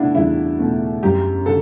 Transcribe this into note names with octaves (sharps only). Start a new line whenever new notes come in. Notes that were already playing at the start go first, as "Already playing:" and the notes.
Already playing: B2 A3 D4 E4 F#4
E2 E4
B2 A3
F#2 G4
D3 A4